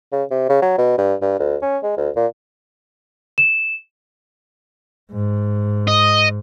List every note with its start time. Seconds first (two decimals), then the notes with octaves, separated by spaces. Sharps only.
0.12 C#3
0.31 C3
0.49 C#3
0.62 F#3
0.78 B2
0.98 G2
1.22 G2
1.39 D2
1.62 C#4
1.83 G#3
1.97 D2
2.16 A#2
3.38 E7
5.12 G#2
5.87 D#5